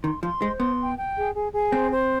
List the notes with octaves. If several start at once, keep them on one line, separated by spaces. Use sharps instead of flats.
D#3 C6
F3 C6
G#3 C5
B3 C6
G5
G5
G#4
G#4
G#4
C4 C5
C5